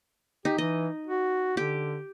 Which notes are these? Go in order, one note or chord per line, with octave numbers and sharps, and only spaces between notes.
D#4 G4
E3 D#5
F#4
D3 G4